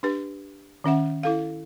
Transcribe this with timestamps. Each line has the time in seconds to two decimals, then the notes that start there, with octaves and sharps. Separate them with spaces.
0.03 D4 G4 B4
0.84 D#3 C#4 E5 F#5
1.23 E4 A4 F5